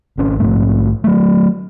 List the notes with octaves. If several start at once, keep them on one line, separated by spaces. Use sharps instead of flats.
G#1 C#4
A#1 G#2 A3
F#3 A3